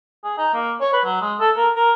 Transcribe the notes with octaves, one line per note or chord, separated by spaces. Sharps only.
G#4
D#4
A#3
C#5
B4
F#3
G#3
A4
A#4
A#4